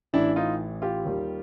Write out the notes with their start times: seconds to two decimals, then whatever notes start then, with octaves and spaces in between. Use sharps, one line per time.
0.13 A1 A2 E3 D4 E4
0.36 D#4 F4
0.82 F4 G4
1.05 D#2 D#3 G3 A#3